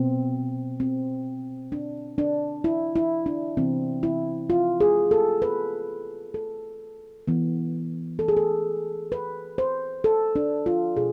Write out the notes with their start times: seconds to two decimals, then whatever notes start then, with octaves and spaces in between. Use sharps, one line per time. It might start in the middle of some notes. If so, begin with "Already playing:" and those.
Already playing: B2 B3 C4
0.80 C4
1.72 D4
2.18 D4
2.64 E4
2.96 E4
3.26 D4
3.57 C3 E3 B3 C4
4.03 E4
4.50 F4
4.80 G#4
5.11 A4
5.42 B4
6.34 A4
7.28 E3 B3
8.19 A4
8.28 G#4
8.37 A4
9.12 B4
9.58 C5
10.04 A4
10.36 D4
10.66 F4
10.97 B2 G#4